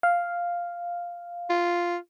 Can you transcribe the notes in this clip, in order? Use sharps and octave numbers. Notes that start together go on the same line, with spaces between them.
F5
F4